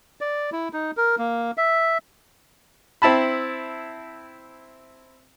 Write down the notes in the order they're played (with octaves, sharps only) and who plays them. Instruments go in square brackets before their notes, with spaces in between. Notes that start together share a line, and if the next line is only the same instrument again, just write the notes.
[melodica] D5
E4
D#4
A#4
A#3
E5
[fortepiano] C4 E4 A5 B5